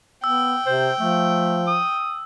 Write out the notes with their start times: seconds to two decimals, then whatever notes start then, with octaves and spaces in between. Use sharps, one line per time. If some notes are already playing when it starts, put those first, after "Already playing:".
0.24 B3 G5 E6
0.66 C3 C5
1.00 F3 A3
1.67 D#6